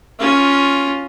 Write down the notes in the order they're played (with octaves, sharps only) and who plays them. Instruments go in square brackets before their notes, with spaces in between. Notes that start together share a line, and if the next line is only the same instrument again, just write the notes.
[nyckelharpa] C#4 F4